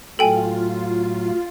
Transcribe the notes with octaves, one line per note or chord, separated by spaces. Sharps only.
A2 F#3 F4 A4 G5 G#5